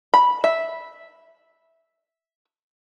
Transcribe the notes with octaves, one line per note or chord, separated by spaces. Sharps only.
B5
E5